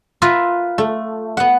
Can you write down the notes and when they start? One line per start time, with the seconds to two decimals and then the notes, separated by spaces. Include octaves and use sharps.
0.22 F4 A#4 B4 E5
0.78 A3
1.37 B3 F#5